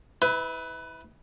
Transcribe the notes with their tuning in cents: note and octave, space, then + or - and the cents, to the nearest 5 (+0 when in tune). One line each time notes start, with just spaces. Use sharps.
E4 -25 B4 +20